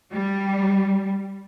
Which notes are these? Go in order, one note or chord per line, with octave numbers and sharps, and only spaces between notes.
G3